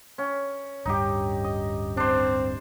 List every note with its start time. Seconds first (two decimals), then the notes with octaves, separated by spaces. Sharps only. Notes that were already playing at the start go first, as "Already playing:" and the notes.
0.18 C#4
0.86 D1 G2 D#4 G4
1.44 D#5
1.97 C4 D4 C5